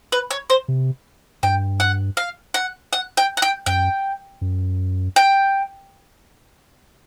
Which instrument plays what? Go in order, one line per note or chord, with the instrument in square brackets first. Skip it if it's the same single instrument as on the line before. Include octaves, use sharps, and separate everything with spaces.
[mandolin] B4
C#5
C5
[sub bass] C3
[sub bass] G2 [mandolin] G5
[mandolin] F#5
F5
F#5
F#5
G5
F#5
G5
[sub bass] F#2 [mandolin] G5
[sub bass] F#2
[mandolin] G5